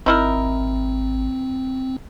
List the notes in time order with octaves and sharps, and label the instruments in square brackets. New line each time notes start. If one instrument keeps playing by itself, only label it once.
[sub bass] G#1 [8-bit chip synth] C4 [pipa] D#4 E4 A#4